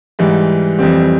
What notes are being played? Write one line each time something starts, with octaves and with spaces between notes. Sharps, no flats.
G#2 E3 G3
F2 E3 G3 C4